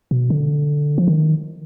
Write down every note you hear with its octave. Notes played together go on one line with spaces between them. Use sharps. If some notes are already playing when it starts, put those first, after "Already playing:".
B2
D3
F3
D#3